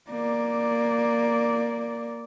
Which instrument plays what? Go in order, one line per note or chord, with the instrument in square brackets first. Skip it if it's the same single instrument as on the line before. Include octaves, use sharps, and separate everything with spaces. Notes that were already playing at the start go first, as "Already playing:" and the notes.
[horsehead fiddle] A#3 D5